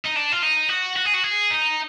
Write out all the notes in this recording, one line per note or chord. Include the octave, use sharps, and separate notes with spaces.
D#4
D4
F4
D#4
F#4
F#4
G#4
F#4
G#4
D#4